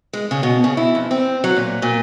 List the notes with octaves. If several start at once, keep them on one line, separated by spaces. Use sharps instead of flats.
G#3
C#3
B2
C#3
E4
F2
C4
F#3
A#2
A#2